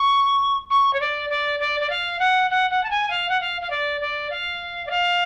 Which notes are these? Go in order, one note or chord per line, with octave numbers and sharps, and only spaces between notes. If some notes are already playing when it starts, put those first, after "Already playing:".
Already playing: C#6
C#6
C#5
D5
D5
D5
D5
F5
F#5
F#5
F#5
A5
G#5
F5
F#5
F5
F5
D5
D5
F5
D5
F5